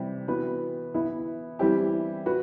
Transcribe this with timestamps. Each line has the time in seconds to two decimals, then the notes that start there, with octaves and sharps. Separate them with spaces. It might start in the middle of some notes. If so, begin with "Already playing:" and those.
Already playing: C3 E3 G3 C4
0.28 E3 B3 F#4 B4
0.94 E3 B3 E4
1.59 E3 G3 C4 E4 G4
2.26 F#4 B4